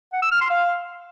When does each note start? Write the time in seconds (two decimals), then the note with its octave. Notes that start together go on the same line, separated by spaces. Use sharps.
0.13 F#5
0.22 E6
0.32 F6
0.41 C6
0.50 F5